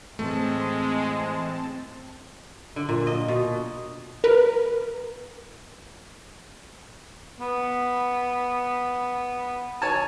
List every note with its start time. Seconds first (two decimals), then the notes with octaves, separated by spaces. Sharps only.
0.19 A2 E3 G#3 A3 C4 A5
2.76 D3
2.89 A#2
3.07 D#5
3.28 B2
4.24 A#4 B4
7.41 B3
9.82 C#5 G#5 A5